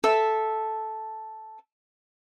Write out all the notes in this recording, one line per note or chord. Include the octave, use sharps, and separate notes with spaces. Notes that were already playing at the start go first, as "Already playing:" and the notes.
A4 E5